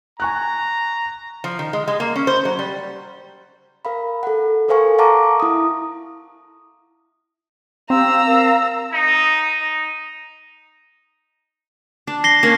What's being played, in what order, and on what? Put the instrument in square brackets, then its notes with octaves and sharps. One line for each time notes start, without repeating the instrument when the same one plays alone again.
[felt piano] G#5 C#6 F#6 [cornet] A#5
[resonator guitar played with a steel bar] F3
D#3
G#3
G#3
A#3
C#4
C5
F#3
G3
[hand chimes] A#4 F5 B5
A4 F#5
A4 A#4 C5 F5 G#5 C#6
F5 F#5 A5 A#5 C#6 D6
E4 D#6
[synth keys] C4 [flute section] G4 F5 [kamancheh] A#5 E6
[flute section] A#4 F5
[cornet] D#4
D#4
[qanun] D4
[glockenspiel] A#6 C7 G7
[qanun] A#3 C#4 D4